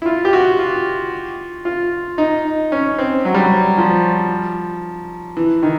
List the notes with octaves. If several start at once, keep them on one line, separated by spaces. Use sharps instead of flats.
E4
F4
G4
F#4
F4
F4
D#4
C#4
C4
F#3
G3
F#3
F3
E3
D#3